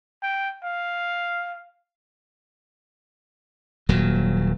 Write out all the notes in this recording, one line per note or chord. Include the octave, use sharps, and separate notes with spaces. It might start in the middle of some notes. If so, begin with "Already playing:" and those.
G5
F5
D#1 A#2 F#3